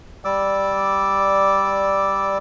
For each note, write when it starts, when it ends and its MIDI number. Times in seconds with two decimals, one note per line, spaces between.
0.25 2.38 55
0.25 2.38 74
0.25 2.38 86
0.25 2.38 88